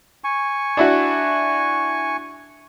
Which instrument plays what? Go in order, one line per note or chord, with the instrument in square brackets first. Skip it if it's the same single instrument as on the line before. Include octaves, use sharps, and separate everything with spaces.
[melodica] G#5 C#6
[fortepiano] D4 E4 F#4